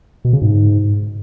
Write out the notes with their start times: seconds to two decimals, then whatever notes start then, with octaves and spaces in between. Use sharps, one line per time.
0.25 B2
0.33 C#3
0.42 G#2